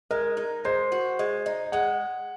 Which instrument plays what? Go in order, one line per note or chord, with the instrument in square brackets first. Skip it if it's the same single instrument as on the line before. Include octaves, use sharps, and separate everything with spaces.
[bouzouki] G#3 [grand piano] A#4
[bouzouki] D#4
[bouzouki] G#3 [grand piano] C5
[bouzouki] F#4
G#3
D#4
[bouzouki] G#3 [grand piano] F#5